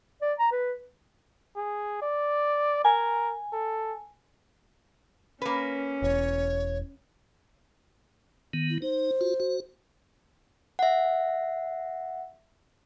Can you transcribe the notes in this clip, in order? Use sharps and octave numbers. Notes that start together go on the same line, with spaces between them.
D5
A#5
B4
G#4
D5
A#4 G#5
A4
A#3 C#4 B4
E1 C#5
D#3 B3
E4
D#4 C5
F4 F#4
F#4
E5 F#5